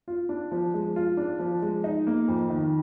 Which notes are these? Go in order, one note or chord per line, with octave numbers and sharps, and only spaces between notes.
F4
D4
F3
G#3
F4
D4
F3
G#3
D#4
A#3
F2
D#3